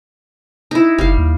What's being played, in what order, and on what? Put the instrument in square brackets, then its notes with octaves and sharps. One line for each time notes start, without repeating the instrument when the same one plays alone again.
[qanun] D#4 E4
[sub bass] F#1 [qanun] G3 F5
[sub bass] D#2